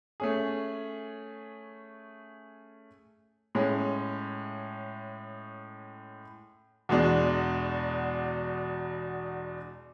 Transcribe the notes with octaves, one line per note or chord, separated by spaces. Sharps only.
A3 C#4 G#4
A2 G#3 C#4
E2 B2 G#3 D4